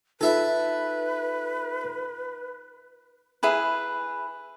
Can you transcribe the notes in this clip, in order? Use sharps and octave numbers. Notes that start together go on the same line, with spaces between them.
D#4 F4 A4 B4 E5
E4 G#4 B4